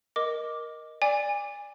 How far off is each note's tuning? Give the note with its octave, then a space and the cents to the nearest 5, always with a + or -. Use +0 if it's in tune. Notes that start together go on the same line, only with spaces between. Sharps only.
A#4 +15 D#5 +0 D6 +0
D5 +0 G#5 -25 D6 +0